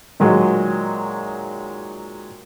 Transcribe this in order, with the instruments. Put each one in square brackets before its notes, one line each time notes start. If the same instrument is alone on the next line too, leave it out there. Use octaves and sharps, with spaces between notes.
[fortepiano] A#2 D#3 F#3 G#3